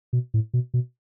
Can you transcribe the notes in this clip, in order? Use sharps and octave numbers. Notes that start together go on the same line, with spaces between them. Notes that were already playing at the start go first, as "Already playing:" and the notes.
B2
A2
B2
B2